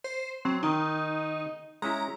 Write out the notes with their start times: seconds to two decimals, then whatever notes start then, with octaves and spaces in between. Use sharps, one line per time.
0.04 C5
0.45 F#3 C4
0.63 D#3 D#4 G5
1.82 G#3 C#4 E4 A#5